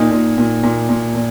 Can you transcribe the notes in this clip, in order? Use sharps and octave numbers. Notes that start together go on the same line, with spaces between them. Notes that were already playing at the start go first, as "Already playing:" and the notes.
Already playing: A#2 D#4
A#2
A#2
A#2
A#2
A#2